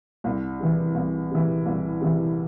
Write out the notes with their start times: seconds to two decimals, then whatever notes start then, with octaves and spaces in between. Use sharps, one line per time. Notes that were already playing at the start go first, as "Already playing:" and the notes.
0.24 C2
0.60 C3 E3
0.95 C2
1.30 C3 E3
1.66 C2
2.01 C3 E3